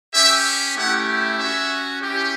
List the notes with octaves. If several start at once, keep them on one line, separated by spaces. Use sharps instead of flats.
C#4 G4 E5
A3 C#4 E4 G4 F#5
C#4 F#4 E5
C#4 E4 G4